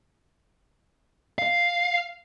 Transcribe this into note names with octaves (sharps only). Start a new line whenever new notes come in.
F5